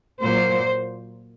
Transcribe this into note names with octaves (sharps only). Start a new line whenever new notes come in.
A#2 F#3 A#3 C5